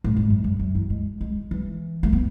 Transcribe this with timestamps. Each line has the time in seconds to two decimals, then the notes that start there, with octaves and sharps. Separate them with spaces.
0.04 A2
0.17 G#2
0.30 F#2
0.44 F#2
0.59 F#2
0.75 E3
0.90 G#3
1.21 G#3
1.51 E3
2.03 A3
2.13 B3